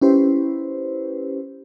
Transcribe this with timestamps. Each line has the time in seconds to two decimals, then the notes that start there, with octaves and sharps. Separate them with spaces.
0.01 C#4 E4 G4 B4 C5